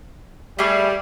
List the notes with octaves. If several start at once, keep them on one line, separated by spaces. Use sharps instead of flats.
G3 A3 G#4